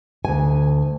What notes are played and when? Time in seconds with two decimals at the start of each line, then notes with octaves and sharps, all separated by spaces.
0.25 D2 G#5